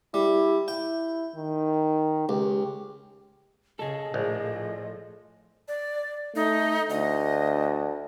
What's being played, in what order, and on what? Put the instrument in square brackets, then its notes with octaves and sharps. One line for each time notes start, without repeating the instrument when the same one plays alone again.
[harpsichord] G3 [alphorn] E4
[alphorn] E4 [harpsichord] G5
[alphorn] D#3
[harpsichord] C#2 [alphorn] G4
[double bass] C#3 [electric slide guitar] G#4 A4 [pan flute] D#5
[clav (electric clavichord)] A#1 [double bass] A2 F3
[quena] D5
[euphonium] A3 [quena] D#4
[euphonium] D2 [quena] D#5